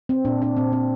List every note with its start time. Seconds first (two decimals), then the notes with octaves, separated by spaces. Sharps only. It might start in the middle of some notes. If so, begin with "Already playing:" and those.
0.09 C4
0.25 A#2 D4
0.42 D4
0.57 A#2 C4
0.72 C4